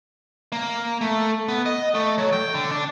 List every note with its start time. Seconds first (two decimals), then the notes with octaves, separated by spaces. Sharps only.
0.52 A#3
1.01 A3
1.48 B3
1.66 D#5
1.94 A3
2.18 F#3
2.33 G5
2.55 D3
2.72 D4